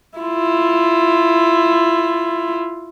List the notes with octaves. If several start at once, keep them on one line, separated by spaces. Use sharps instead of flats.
E4 F4